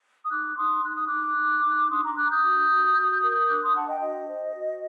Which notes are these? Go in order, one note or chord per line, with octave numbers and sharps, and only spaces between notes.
D#6
D#4 D6 F#6
D#4 C6 D#6
D#4 F#6
D#6
D#4 D6 F#6
D#4
D#4
D4 C6 D#6
A#5 D6
D4 D6 F#6
D#6 G6
F#4
F#4
F#4
A#4
D4 D6 F#6
C6 D#6
D4 F#5 A5
D#5 G5
F#4 D#5
C5
F#4